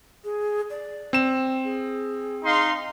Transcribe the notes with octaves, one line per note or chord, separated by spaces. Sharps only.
G#4
D5
C4 E7
G#4
D#4 F5 C6